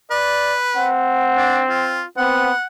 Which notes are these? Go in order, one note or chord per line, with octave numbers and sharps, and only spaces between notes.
B4 D5
C4 F#5
D4
F4
B3 C4 F#5